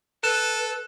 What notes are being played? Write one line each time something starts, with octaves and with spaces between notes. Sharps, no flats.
A4 B4 F#6 E7